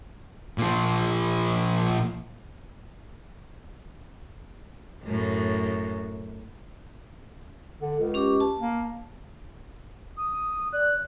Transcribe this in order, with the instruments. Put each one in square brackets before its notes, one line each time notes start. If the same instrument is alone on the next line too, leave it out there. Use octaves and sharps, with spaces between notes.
[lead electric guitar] A#2 F3
[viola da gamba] F#2 A2
[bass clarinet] D3
C#2
[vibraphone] C#4 G4 D6
A5
[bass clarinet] A#3
[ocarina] D#6
[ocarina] D5 [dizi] F#6